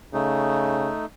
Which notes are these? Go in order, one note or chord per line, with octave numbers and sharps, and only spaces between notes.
C#3 A3 D#4